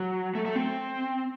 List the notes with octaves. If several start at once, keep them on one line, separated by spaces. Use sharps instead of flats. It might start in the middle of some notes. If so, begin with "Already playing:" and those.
Already playing: F#3
A3
A3
C4